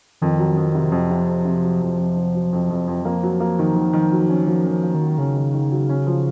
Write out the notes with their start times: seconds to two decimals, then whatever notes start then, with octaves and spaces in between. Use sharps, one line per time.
0.22 F2 D#3
0.39 F#3
0.57 F2
0.75 C3
0.92 F2 F3
1.10 C3
1.28 F2
1.45 C3
1.63 F#3
1.81 F2
1.98 F2
2.17 C3
2.35 F#3
2.53 F2
2.70 F2
2.87 F2
3.05 F3 A#3
3.23 F#3
3.40 A#3
3.59 D#3
3.76 D#3
3.93 D#3
4.12 F#3
4.29 C#4
4.47 F3 F#3
4.65 C#4
4.71 F3
4.83 A#3
4.95 D#3
5.01 F#3
5.18 C#3 C#4
5.36 D#3
5.54 D#3
5.71 F#3
5.89 C#4
6.06 F3